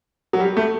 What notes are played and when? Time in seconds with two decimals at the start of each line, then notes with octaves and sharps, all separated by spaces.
0.33 F#3
0.40 G3
0.57 A3